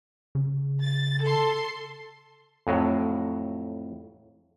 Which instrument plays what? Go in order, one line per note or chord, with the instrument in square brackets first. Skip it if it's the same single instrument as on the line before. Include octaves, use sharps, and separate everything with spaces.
[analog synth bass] C#3
[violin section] A6
A4 C6
[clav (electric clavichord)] F2 A2 F#3